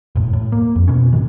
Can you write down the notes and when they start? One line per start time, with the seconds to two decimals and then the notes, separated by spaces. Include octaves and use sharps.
0.15 E1 A2
0.33 A2
0.52 A#3
0.76 F2
0.88 B2 C#4
1.13 A2 D#3